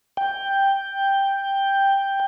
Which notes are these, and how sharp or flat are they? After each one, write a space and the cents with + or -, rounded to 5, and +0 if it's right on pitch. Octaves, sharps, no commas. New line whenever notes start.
G5 +5